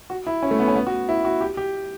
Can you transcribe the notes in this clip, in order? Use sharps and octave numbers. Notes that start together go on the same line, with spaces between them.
F#4
E4
C#4
A3
B3
C#4
B3
F#4
E4
F#4
G4
G4